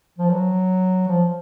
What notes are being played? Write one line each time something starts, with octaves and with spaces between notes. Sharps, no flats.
F3
F#3
F3